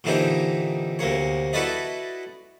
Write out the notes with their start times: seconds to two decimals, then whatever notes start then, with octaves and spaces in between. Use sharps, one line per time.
0.04 A#2 D3 E3 C4 D#4 G4
0.99 D2 C3 A#3 C#5
1.53 E4 F#4 A4 B4 D5 D#5